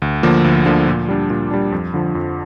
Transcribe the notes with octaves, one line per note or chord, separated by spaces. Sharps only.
D2
D3 F3 A#3
D2
D3 F3 A#3
A#2
G3 D4
A#2
G3 D4
F2
D3 F3
F2